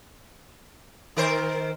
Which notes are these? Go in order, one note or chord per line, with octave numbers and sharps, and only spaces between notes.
D#3 A#4 C5